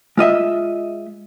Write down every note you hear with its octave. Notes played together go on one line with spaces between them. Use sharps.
G#3 F4 D#5 E5